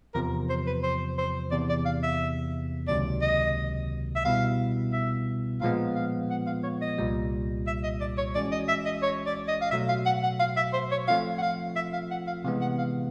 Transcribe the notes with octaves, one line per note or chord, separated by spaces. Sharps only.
E2 C3 F3 A#4
C5
B4
C5
C5
E2 C3 E3 D5
D5
F5
E5
C#2 C3 D#3 F#3 A#3 D5
D#5
E5
B2 G3 B3 E4 F5
E5
A#2 F3 G#3 B3 F5
F5
F#5
F5
C#5
D#5
C2 A#2 G3
E5
D#5
D5
C#5
E3 G#3 C#4 F#4 D5
D#5
E5
D#5
C#5
D5
D#5
F5
B2 F#3 A3 E5
F5
F#5
F#5
F5
E5
C5
C#5
F3 A3 C4 F4 F5
F#5
F5
E5
F5
F#5
F5
C3 E3 G#3 B3 F5
F#5
F5